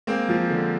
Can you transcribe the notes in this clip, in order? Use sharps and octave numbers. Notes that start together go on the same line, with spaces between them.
G#3 A#3 C4
F3
D3